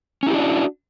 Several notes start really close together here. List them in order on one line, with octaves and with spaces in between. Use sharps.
C#4 E4 G4 D4 F#4